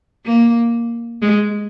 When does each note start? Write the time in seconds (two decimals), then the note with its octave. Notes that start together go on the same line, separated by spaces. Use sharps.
0.25 A#3
1.22 G#3